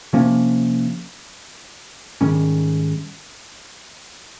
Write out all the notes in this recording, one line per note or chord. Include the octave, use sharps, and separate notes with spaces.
C3 F3 A#3 C#4
G#2 D#3 G3 C#4